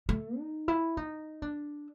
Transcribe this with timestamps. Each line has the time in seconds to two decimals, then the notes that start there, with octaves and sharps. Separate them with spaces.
0.09 A3
0.39 D#4
0.68 E4
0.97 D#4
1.42 D4